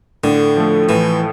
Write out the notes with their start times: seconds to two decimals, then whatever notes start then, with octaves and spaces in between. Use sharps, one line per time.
0.24 A2 D3
0.57 F3 A3
0.89 A2 E3